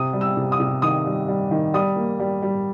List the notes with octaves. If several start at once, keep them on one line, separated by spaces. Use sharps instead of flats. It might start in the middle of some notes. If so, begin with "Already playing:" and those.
Already playing: C3 D#6
G3
E6
C3
D#6
C3
D#3 D#6
G3
G3
D#3
G3 D#6
A#3
G3
G3